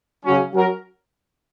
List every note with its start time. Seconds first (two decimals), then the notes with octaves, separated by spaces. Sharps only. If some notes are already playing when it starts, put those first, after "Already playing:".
0.24 C#3 F#3 C#4
0.52 F#3 C#4 F#4 A#4